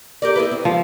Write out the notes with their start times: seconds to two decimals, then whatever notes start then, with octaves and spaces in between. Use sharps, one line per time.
0.22 G4 A#4 D5
0.36 B3 E4 B4
0.51 C4
0.65 F3